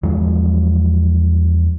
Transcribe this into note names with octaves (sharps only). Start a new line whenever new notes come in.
E2 F3 F#3 G#3